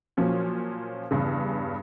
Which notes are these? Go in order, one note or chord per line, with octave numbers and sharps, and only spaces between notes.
A#2 F3 F#3 C#4
E2 G2 C#3